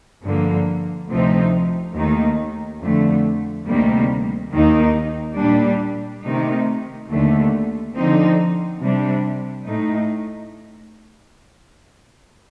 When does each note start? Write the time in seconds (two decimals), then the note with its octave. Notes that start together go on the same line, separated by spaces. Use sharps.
0.25 G2 D3 F3 A#3
1.10 D2 C3 F3 C4 D#4
1.96 D#2 D#3 A3 D#4
2.82 F2 D3 A3
3.67 D2 C3 D#3 G3 A#3
4.54 D#2 D#3 A#3 D#4
5.38 A#2 G3 D4
6.24 C3 D#3 A3 D#4
7.10 D#2 D3 A3
7.96 D3 F3 C4 D#4
8.82 C3 G3 D4
9.67 A2 A3 D#4